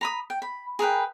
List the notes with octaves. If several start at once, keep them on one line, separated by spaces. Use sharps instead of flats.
A#5 B5 D#6
G5
B5
G#4 A#4 B4 G5